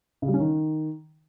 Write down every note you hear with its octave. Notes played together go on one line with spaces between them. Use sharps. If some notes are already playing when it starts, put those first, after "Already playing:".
C#3
G3
C#4
D#3